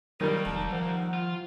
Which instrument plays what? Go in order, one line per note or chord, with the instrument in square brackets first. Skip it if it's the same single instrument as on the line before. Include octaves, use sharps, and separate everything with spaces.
[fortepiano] D#3 G3 [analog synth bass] F#3 [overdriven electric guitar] A#3 D#4 [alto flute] A#4
[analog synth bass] F1 [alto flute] A5
[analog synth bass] F3 [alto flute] F#5
[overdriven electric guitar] F4